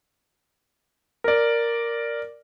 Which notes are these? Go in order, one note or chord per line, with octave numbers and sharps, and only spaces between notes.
A#4 D5